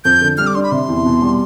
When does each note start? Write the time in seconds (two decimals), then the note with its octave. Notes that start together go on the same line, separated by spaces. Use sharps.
0.05 F2 G6
0.21 D3
0.38 G3 F6
0.47 D6
0.55 D4 C6
0.63 B5
0.72 C3 C6
0.88 E2
1.05 B2
1.22 G3